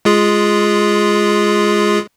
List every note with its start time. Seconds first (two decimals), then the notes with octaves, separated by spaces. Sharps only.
0.05 G#3 F4 G#4